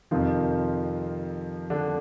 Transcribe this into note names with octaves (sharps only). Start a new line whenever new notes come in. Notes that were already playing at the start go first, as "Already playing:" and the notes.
F2 C3 D#3 F3 F4
D3 D4